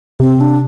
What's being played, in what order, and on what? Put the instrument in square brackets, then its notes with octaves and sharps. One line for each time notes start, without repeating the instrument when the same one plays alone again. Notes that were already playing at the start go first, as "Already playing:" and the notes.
[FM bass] C3 [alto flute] C4
[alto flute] D4